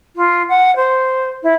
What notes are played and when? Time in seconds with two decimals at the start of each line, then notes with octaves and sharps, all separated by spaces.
0.16 F4
0.49 F#5
0.76 C5
1.42 E4